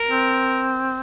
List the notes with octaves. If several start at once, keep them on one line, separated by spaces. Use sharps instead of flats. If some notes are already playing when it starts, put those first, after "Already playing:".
Already playing: A#4
C4